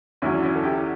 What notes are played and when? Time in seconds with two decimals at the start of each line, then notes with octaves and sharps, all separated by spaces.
0.22 E2 D3 F#3 C#4 E4
0.43 C#4 E4
0.55 A4
0.64 E4 G4